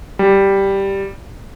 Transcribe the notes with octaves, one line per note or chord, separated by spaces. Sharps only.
G3